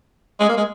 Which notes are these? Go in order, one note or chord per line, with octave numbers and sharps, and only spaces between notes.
G#3
A#3
G#3